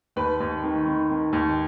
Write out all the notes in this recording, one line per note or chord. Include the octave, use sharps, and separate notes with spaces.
D#2 B4
D#2
D#3
D#3
D#3
D#2